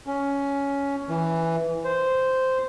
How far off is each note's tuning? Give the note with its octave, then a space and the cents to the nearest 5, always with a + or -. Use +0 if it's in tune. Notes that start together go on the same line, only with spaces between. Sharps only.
C#4 +10
E3 +0
C5 -10